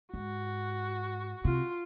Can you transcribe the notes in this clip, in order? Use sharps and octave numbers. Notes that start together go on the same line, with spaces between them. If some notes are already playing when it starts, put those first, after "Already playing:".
G#2 F#4
C3 F4